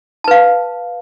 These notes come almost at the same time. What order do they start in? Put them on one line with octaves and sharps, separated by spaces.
A5 B4 F5